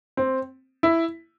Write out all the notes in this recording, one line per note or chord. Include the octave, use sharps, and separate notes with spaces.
C4
E4